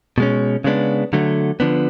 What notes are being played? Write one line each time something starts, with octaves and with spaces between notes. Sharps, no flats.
B2 G#3 C#4
C#3 G#3 B3 D4
D3 F#3 A3
D3 F3 B3 D4